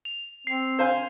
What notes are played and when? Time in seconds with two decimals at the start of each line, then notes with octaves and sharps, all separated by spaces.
0.05 F7
0.47 C4 C7
0.79 C5 F5 G#5